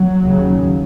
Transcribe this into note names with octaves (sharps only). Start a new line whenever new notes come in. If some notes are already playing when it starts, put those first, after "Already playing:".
Already playing: F#3
D#2 C#3